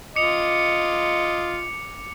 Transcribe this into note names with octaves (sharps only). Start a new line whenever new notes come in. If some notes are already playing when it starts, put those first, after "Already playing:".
F4 D#5 D6 C#7 F7